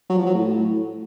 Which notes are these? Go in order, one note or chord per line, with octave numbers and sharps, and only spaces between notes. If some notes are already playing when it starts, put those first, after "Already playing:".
F#3
F3
F#3
A2